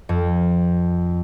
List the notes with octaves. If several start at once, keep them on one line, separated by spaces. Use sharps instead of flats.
F2